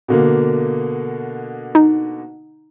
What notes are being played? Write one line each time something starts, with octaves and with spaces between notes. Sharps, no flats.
B2 D3 A#3
D#4